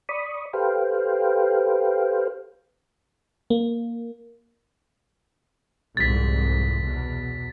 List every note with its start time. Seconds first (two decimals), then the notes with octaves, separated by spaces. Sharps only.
0.09 D5 B5 C#6 D#6
0.53 G4 A4 B4 C5 F5 G5
3.50 A#3
5.97 C2 F2 G#2 A6 B6
6.85 E2 B2